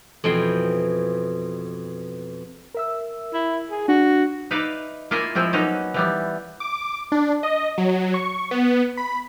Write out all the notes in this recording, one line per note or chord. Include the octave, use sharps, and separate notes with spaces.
F2 B2 E3 C5 G5 C6
A#4 E5 E6
E4
G#4
D4 F#4
D#4 B4 D5 E5 F5
A#3 E4 F4 D#5 E5 G#5
F3 G#3 C4 E4 F4
F#3 A#3 B3 C#4 D#4
E3 G3 B3
D6
D4
D#5
F#3
C#6
B3
B5